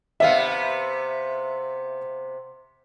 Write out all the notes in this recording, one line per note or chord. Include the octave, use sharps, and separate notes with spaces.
C3 B3 E5 F5